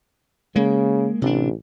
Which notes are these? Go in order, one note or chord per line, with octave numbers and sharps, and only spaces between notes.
C#3 G#3 A#3
A1 C3 D4